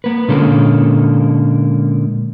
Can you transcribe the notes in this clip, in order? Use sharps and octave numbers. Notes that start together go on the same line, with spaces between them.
A#3 B4
A#2 D3 G#3 A#3 C#4 A4